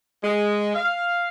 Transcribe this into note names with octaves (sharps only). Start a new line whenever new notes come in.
G#3
F5